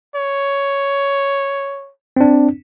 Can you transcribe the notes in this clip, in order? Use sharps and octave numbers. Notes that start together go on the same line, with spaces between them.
C#5
C4 D4